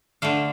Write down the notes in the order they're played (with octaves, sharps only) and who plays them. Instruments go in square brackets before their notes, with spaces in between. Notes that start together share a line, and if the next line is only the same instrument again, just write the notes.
[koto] D3 A3 F5